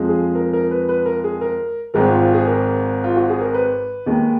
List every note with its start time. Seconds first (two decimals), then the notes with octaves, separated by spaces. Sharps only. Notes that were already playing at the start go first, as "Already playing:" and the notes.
Already playing: F2 F3 G#3
0.09 G#4
0.35 A#4
0.53 A#4
0.71 B4
0.89 B4
1.06 A#4
1.24 G#4
1.41 A#4
1.94 G#1 G#2 D#3 G#3 A#4
2.08 F4
2.21 F4
2.34 G#4
2.47 A#4
3.04 F4
3.16 F#4
3.29 G#4
3.41 A#4
3.54 B4
4.06 D#2 D#3 G#3